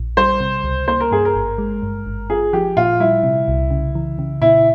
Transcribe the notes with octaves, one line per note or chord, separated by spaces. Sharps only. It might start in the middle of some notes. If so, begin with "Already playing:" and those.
Already playing: A#1
G3 C5
C3
C#2
A#3 C5
A#4
G2 G#4
A#4
G#1
G#3
G2
G#1
F4 G#4
F3 G4
A#2 F4
G3 E4
C3
C2
C#3
E3
C#3
A#2 E4